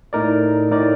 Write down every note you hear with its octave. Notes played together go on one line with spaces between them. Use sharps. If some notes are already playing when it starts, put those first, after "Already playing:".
A2 A3 D#4 A#4 D5
A2 A3 D#4 A#4 D5